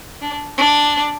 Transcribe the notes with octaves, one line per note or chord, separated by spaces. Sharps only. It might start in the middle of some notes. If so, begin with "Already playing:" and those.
D4
D4